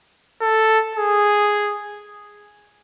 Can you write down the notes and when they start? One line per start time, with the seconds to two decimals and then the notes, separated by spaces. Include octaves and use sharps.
0.41 A4
0.95 G#4